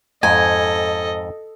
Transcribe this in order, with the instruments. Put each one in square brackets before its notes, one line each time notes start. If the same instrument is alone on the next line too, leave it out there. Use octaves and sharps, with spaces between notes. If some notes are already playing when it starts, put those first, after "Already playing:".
[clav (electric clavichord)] F2 G#2 [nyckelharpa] A4 D#5 [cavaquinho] G#5